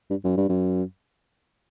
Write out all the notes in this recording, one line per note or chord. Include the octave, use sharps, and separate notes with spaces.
G2
F#2
G2
F#2